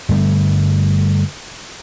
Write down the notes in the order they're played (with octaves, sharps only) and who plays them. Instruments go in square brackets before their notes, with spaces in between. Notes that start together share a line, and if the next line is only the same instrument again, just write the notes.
[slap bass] G2 D3 G3 A3